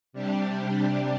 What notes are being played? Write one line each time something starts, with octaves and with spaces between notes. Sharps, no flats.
C3 G3 D4 G4